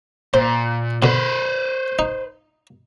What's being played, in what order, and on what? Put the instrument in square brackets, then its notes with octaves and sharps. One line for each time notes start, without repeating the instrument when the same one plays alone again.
[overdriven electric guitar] A#2 [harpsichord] C5
[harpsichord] B2 D3 [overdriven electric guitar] B4 C5
[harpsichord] D#4